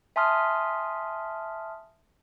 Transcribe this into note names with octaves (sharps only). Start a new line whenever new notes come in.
E5 G#5 A5 C6 D#6 F6